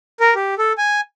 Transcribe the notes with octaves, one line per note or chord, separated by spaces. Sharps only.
A#4
G4
A4
G#5